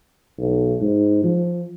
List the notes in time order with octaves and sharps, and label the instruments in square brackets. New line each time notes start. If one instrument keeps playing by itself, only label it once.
[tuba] B1
G#2
F3